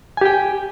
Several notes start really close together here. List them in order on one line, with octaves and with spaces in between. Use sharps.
G#5 G4 G5